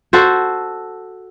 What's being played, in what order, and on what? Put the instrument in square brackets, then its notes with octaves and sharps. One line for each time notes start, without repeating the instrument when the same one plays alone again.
[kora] F#4 A4 C5